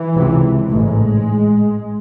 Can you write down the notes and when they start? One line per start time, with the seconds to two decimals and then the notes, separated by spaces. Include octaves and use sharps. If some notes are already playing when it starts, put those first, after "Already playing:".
Already playing: E3
0.14 C#2 C3
0.70 A1 G#2 G#3